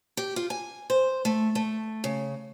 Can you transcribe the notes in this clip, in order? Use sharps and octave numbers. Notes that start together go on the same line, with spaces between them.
G4
F4
G#5
C5
A3
A3
C#3